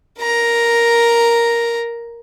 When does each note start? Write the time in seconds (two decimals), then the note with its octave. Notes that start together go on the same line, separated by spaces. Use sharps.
0.21 A#4 A#5